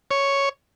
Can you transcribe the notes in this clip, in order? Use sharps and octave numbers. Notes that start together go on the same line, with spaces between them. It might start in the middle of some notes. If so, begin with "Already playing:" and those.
C#5